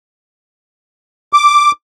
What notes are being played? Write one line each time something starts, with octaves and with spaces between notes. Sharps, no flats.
D6